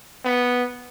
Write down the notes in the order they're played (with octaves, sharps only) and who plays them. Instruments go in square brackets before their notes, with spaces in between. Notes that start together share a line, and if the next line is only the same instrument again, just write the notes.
[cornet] B3